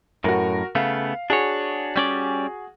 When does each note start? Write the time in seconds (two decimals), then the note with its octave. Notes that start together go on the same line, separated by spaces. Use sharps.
0.24 F#2 A2 F#4 A#4
0.75 C#3 A3 B3 F5
1.30 D4 F#4 G#4 C#5
1.96 G3 C#4 D5